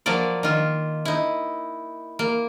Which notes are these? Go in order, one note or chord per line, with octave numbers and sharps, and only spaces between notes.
F3 F#3 A#3 D5
D#3 F4
D#4 E4
A#3